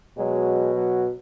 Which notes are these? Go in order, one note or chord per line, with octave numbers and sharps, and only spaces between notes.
B2 F#3 G#3
F#3